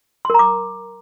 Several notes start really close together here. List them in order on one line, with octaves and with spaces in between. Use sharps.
C6 A#4 A#5 D6